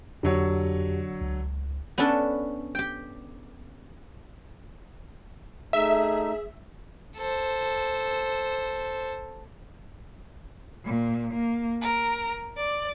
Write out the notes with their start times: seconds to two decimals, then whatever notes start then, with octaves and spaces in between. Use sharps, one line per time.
0.23 F2 D3 F#3 G4 C#5
1.21 C#2
1.98 B3 C#4 D4 A4
2.75 G4 G5
5.73 A3 D#4 G#4 E5
7.16 A4 C5
10.85 A#2
11.34 A#3
11.80 A#4
12.56 D5